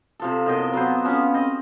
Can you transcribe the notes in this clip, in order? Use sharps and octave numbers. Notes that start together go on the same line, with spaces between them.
C3 F3 A4
F#2 A2 C3 B3 D#5 G5
F#3 B3 C5
F3 C#4
C4 D#5